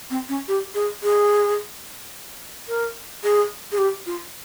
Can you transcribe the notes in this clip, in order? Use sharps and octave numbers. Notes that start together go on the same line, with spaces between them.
C4
C#4
G4
G#4
G#4
A#4
G#4
G#4
G4
F4